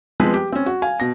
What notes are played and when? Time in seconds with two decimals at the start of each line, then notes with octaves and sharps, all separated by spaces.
0.20 F3 G#3 B3 C4 B4
0.34 G4
0.52 C4 C#4
0.66 F#4
0.82 F5 G#5
1.00 B2 A#6